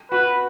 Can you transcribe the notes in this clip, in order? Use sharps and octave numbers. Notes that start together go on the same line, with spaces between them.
F#4 B4